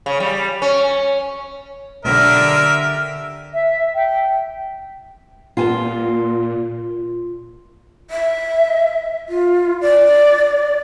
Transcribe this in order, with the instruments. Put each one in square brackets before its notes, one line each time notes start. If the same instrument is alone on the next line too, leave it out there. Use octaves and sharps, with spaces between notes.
[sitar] C#3
G3
C#4
[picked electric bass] B1 [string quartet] D3 G4 [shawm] A#4 [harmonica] E5
[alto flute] E5
G5
[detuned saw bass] A#2 [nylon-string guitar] F4 G#5 A5
[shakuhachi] E5
F4
D5